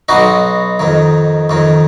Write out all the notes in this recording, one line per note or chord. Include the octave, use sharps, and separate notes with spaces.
B1 B2 D#4 F#4
F2 D#3
F2 D#3